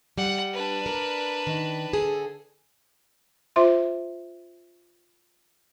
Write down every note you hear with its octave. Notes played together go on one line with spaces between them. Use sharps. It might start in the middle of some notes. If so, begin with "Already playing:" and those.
G3 F#5
D4 B4
A#4
D#3
D3 G#4 A4
F4 C5 E5 C6